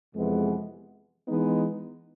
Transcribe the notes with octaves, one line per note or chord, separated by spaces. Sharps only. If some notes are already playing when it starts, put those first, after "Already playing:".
F2 C3 E3 G#3 B3
E3 G#3 B3 D#4